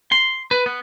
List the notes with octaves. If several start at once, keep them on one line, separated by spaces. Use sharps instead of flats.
C6
B4
B3